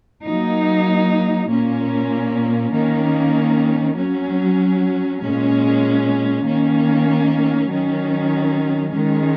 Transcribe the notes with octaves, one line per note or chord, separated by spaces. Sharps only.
F#3 A#3 D#4
A#2 A#3 C#4
D#3 A#3 C#4
F#3 C#4
A#2 G#3 C#4
D#3 A#3 C#4
D#3 F#3 C#4
D#3 G#3 C#4